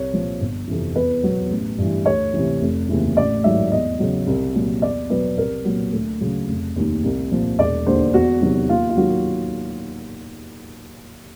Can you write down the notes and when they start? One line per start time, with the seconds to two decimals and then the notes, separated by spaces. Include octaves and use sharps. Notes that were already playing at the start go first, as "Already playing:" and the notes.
Already playing: C2 C#5
0.13 A#2 F3
0.40 G1
0.67 F2 C3 E3
0.95 E2 B4
1.23 B2 F#3
1.51 A1
1.78 G2 E3
2.06 D2 C#5
2.34 C3 E3
2.62 F1
2.89 D#2 C#3 E3
3.17 A1 D5
3.44 G#2 D#3 F#3 E5
3.72 E2 D#5
3.99 C#3 F#3
4.27 C2
4.55 A#2 F#3
4.82 E2 D5
5.10 B2 F#3 B4
5.38 C2 A#4
5.65 A#2 F#3
5.93 D2
6.20 C#3 F#3
6.48 F1
6.76 D#2 D#3
7.03 C2
7.32 A#2 F3
7.58 E1 D5
7.86 D#2 D3 C5
8.14 E2 F#4
8.41 C3 D#3 F#3
8.69 D#2 F4
8.90 F4
8.97 D#3 F#3 F#4